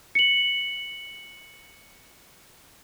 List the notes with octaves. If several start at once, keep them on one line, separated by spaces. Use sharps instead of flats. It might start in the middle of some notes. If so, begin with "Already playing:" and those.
C#7 F#7